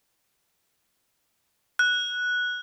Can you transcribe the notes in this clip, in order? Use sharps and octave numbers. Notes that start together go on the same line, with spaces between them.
F#6